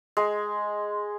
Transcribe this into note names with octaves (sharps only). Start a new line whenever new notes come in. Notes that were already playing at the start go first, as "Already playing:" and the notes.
G#3